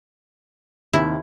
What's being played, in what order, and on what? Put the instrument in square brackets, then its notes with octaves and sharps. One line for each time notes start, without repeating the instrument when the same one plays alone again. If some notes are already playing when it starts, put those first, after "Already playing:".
[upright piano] D#2 C3 D#3 [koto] E4